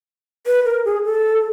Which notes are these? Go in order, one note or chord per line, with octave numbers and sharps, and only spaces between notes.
B4
A#4
G#4
A4